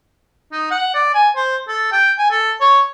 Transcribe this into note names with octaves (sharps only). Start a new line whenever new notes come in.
D#4
F#5
D5
G#5
C5
A4
G5
G#5
A4
C#5